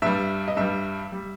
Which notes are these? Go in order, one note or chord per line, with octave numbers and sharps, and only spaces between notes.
G2 G3 E5
D#5
G2 G3 E5
G3